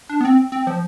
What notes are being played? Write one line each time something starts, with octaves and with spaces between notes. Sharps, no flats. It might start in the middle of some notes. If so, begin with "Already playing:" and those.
D4
B3
C4
C4
F3